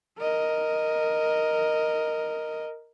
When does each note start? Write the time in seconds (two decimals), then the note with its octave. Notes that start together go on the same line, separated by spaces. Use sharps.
0.18 A#4 D#5